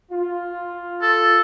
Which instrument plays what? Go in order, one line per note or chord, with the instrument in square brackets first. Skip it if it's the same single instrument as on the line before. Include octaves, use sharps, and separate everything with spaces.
[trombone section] F4
[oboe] A4